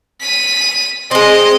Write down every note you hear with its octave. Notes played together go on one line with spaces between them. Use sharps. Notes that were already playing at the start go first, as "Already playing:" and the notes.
B6 D#7
G#3 C4 D#5